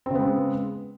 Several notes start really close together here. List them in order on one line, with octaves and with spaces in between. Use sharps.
C4 C#3 B3 G#3